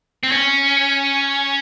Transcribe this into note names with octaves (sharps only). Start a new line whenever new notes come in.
C4
C#4